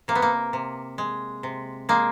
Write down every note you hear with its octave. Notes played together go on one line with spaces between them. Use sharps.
C3 A#3
B3
A#3
C3
G#3
C3
G#3 A#3